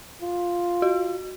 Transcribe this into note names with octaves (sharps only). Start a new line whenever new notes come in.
F4
F#4